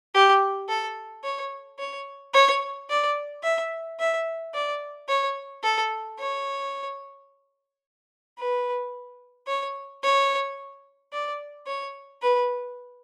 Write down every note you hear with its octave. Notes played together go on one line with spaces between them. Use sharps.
G4
A4
C#5
C#5
C#5
D5
E5
E5
D5
C#5
A4
C#5
B4
C#5
C#5
D5
C#5
B4